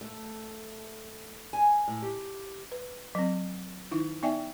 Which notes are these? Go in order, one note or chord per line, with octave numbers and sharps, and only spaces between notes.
A3
G#5
A2
G4
B4
F#3 C4
D#3 D#4 E4
B3 D#4 D5 E5 G5 G#5